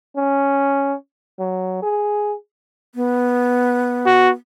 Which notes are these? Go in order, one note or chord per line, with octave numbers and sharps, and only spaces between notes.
C#4
F#3
G#4
B3
F#4